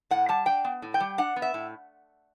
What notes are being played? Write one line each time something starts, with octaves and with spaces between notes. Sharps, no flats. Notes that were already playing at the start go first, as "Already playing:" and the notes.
A2 F#5
G3 A5
D4 G5
B3
A2
G5
G3
D4 F#5
B3
E5
A2